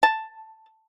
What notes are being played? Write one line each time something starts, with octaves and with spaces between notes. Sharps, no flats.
A5